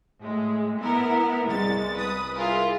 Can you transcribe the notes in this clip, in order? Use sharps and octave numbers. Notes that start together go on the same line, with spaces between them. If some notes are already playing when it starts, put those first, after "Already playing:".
A2 G#3
B3 E4 A#4
C2 G#3 A6
B4 D#6
E4 F4 G#4 A#4